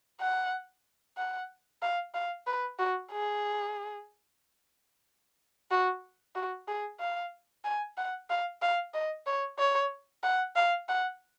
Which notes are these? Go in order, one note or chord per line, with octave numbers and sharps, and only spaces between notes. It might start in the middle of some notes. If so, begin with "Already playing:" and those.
F#5
F#5
F5
F5
B4
F#4
G#4
F#4
F#4
G#4
F5
G#5
F#5
F5
F5
D#5
C#5
C#5
F#5
F5
F#5